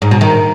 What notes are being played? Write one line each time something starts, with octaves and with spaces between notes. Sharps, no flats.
G#2
B2
D#3